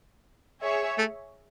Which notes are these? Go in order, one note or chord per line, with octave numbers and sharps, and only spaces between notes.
G#4 C#5 E5
A3